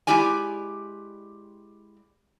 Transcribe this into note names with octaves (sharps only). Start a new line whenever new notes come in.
G#3 A#3 E4 G4 D5 G#5